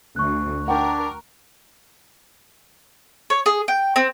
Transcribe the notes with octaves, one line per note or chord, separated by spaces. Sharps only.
D2 C#6 F#6
D4 A#4 F#5 G5
C#5
G#4
G5
C4